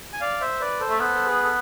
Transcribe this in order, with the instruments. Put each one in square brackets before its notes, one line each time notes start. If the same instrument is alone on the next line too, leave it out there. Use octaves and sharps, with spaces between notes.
[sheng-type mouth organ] G#5
D5 F5
C5 E5
B4 D5
A4 C5
[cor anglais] A3
[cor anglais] B3 [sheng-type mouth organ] A4 C5
[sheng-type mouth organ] A4
G#4 B4
A4